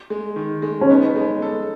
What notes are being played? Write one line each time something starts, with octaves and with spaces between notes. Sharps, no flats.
G#3
D#3
G#3
C#4
B3 D#4
G#3
A4